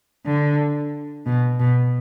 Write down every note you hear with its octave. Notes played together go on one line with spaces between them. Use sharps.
D3
B2
B2